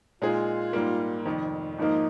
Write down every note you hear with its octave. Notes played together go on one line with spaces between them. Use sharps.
A#2 G#3 D#4 F4 G#4
G#2 G3 A#3
F1 F2 D#3
G#1 G#2 F3 A#3 D#4